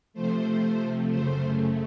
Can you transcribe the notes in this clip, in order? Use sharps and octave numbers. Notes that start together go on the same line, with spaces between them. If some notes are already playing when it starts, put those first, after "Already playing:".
C3 F3 A3 C5
F#2 C#3 A3 C5